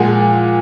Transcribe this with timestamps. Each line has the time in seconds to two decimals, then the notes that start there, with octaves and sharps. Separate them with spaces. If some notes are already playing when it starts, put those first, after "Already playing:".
Already playing: A#2 F3 G#3 F#5